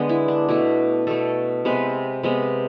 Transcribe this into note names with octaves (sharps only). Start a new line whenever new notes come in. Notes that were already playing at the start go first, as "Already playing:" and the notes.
Already playing: D3 G#3 B3 D5
E4
D4
B2 A3 E4
B2 A3 A4
C3 G#3 B3 B4
C3 G#3 B3